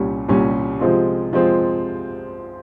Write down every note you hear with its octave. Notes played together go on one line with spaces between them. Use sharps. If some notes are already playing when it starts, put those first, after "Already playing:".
Already playing: C2 A#2 G3 C#4
C2 A#2 G3 C#4
C3 F3 G#3 C4 F4
C3 F3 G#3 C4 F4